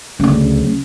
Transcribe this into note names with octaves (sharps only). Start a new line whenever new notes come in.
D2 C#3 F#3